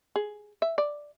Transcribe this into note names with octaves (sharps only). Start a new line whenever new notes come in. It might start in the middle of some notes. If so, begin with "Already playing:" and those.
G#4
E5
D5